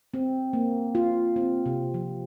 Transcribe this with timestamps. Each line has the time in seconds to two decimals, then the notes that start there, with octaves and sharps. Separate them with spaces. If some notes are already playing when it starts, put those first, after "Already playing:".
0.14 C4
0.53 A#3
0.95 F4
1.36 C4
1.66 C3
1.94 F3